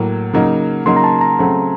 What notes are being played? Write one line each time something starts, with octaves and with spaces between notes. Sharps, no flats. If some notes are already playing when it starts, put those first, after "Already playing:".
Already playing: A2 F#3 A#3
C#3 F#3 A#3 D#4
C#3 F#3 A#3 D#4 C6
A#5
A5
A#5
C#3 F#3 A3 C4